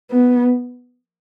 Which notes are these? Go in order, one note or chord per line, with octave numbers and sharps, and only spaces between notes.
B3